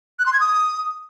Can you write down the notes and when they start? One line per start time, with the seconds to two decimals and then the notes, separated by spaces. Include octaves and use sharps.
0.19 F#6
0.26 C6
0.33 G#6
0.40 D#6